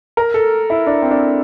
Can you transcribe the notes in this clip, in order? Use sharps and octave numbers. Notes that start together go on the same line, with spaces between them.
A#4
A4
E4
D4
C4
D4